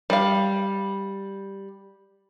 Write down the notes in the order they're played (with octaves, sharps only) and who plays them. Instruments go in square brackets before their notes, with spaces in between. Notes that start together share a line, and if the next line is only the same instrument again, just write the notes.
[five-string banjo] G3 F5